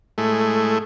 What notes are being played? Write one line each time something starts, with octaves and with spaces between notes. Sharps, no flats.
A2 G#3 A3 E4